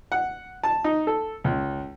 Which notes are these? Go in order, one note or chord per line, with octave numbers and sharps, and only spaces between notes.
F#5
A5
D#4
A4
C#2